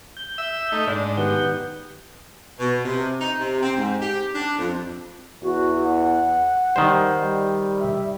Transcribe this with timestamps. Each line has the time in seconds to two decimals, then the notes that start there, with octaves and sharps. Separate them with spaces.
0.17 G6
0.38 E5 E6
0.72 A3 D#4 E5
0.87 G#2 D4
1.17 D#3 B3 G4 G6
2.58 B2
2.85 C3
3.20 D#4
3.39 C3
3.63 C4
3.77 G#2
4.01 G4
4.34 D4
4.57 F2
5.42 E2 F#4
5.85 F#5
6.76 D#3 G3 C5
7.16 G3
7.80 E5